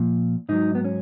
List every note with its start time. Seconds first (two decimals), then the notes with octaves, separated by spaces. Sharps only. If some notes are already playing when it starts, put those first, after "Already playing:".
Already playing: A#2 F3
0.49 G#2 F#3 D#4
0.75 B3
0.84 C#4